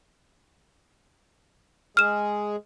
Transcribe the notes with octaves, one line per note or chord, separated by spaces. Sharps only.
G#3 G#4 F6 E7